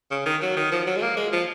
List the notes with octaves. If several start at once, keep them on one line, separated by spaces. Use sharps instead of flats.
C#3
D#3
F#3
D#3
F3
F#3
G#3
A#3
G#3
F3